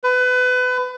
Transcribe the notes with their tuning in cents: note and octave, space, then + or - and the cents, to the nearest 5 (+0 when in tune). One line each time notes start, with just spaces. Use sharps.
B4 +30